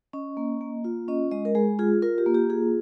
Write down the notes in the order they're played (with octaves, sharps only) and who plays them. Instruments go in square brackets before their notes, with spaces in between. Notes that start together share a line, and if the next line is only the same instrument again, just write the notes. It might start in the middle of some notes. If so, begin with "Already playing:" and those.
[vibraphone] C#4 D#5
A#3
A#3
F4
C#4 D#5
G#3 D#5
A#4
G#3 G#4
F4 G#4
F4 A#4
G4
A#3
G4
F4 G#4